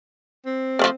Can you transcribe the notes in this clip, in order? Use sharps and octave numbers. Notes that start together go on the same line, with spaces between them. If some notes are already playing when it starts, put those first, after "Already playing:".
C4
F3 A3 A#3